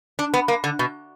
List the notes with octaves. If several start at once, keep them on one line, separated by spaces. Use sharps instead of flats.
D4
B3
A#3
D3
B2